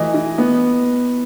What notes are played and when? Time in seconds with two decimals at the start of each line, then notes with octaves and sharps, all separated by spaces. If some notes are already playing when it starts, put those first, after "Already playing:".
Already playing: E3 A3 D#5
0.14 E3
0.38 B3